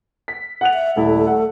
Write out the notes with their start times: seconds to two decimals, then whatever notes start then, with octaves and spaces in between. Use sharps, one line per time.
0.28 B6
0.61 F#5 F#6 F7
0.74 E5
0.96 D#1 A3 E4 A4
1.27 F#5